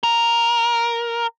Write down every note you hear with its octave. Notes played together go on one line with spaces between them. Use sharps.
A#4